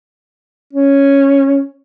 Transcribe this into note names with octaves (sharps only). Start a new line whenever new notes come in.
C#4